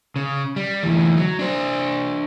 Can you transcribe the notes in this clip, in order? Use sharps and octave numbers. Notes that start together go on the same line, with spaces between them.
C#3
G3
D2 E3
F#3
D4 C5